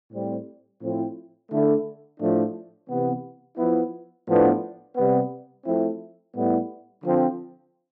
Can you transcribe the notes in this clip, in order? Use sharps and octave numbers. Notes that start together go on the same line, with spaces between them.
A2 G3 C4
A2 F3 C4 E4
D3 A3 E4
A2 F3 A3 D4
C3 E3 B3
F3 B3 E4
A2 F3 B3 D4
C3 G3 B3
F3 A3 C4 E4
A2 G3 B3 E4
D3 F3 C4